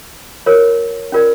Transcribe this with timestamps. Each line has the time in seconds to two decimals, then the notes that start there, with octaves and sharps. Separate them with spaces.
0.46 F4 A#4 C#5
1.12 C#4 F4 A#4 D5 G5